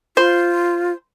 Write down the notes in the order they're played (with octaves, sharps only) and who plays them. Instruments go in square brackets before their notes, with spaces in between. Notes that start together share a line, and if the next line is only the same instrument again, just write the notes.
[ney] F4 [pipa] C5